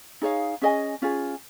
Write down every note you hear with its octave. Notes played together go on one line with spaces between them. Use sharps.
D#4 G#4 C#5 F5
C#4 G#4 D#5 G#5
C#4 F4 G#4